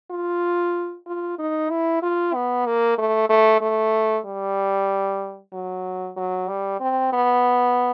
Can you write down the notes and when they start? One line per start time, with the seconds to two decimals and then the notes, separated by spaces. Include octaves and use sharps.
0.11 F4
1.07 F4
1.39 D#4
1.70 E4
2.03 F4
2.34 B3
2.66 A#3
2.98 A3
3.29 A3
3.61 A3
4.26 G3
5.53 F#3
6.17 F#3
6.49 G3
6.80 C4
7.13 B3